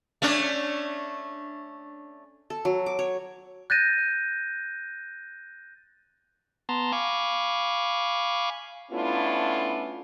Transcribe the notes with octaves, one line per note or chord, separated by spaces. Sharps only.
A3 C#4 D4
A4
F#3
D6
C#5
F#6 G6 A6 A#6 D#7
B3 A5 A#5 C6
F5 G#5 B5 C#6 D6
A3 B3 C#4 D4 E4 F4